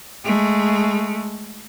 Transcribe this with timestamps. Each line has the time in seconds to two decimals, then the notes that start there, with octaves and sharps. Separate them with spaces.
0.24 G#3 A3